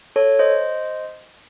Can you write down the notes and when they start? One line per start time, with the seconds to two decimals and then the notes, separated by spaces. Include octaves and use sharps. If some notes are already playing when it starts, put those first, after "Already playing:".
0.16 A4 C#5
0.39 C5 D#5